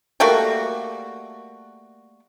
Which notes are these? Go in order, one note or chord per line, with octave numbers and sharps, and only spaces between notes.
G3 A3 A#3 F#4